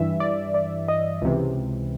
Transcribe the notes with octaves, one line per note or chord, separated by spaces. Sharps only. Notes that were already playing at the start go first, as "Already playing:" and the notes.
Already playing: G2 E3 E5
D5
D5
D#5
C#2 C3 E3